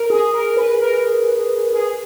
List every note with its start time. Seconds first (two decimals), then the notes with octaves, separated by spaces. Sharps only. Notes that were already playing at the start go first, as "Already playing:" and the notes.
Already playing: A#4
0.10 G#4
0.33 A#4
0.57 B4
0.80 A#4
1.73 G#4